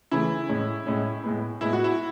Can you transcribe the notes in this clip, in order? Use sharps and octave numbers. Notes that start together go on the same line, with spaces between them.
C#3 E3 A3 E4
A2 G#3 C#4
A2 G#3 C#4
A2 G#3 B3
A2 G#3 B3 E4
F#4
E4